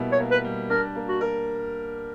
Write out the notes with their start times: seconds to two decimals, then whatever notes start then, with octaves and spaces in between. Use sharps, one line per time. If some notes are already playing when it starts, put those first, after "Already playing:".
Already playing: B2 G3 A#3 E4
0.12 C#5
0.19 A#3
0.31 B4
0.44 G3
0.70 D4 A#4
0.95 A#3
1.08 F#4
1.21 A#4